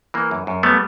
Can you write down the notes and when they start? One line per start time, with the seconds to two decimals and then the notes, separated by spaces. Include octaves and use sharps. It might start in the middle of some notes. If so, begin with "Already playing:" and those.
0.14 E3 A#3
0.31 F#2
0.47 F#2
0.63 G3 A3 B3